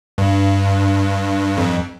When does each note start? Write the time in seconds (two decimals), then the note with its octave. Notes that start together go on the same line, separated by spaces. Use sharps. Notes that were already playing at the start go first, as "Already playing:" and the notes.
0.18 G2
1.58 F2